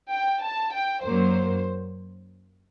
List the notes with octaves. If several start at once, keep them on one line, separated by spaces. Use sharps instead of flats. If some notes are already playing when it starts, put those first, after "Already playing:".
G5
A5
G5
F#2 F#3 A#3 C5